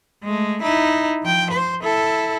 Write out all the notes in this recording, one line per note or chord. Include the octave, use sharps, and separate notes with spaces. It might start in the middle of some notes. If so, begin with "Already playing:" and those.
G#3 A3
D#4 E4
F3 G5
C5
E4 A4